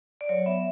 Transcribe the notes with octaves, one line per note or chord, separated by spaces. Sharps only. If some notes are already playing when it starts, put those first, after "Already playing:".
D5
F#3 C#5
B3 E5